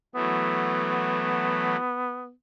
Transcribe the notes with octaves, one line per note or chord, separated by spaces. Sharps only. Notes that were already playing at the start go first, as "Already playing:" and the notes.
E3 F#3 A3 B3